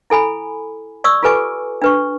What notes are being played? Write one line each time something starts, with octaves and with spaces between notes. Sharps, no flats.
E4 A4 G#5 B5
D5 C#6 D#6 E6
F4 G4 A4 B4 G#5 D6
D4 B4 C#6